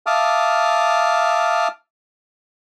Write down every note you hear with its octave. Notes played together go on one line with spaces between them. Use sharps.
E5 F5 A5 D6 D#6 F6